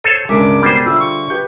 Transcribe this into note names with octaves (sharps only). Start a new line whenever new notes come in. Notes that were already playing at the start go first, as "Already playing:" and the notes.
A4 C5 C#5 D#7
C#2 G2 C#3 G#3 A#4 E5 D6
B2 G3 G#4 C5
D3 F4 E5 E6
C#6
G4 B4 G6